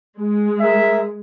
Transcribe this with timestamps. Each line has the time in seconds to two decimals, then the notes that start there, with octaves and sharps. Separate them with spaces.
0.21 G#3
0.61 G#4 A#4 E5